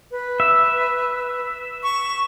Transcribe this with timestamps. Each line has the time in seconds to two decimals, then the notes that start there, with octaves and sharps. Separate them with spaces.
0.11 B4
0.40 E5
1.83 C#6